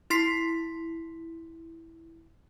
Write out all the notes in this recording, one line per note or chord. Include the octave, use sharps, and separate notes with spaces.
E4 C6 B6 C7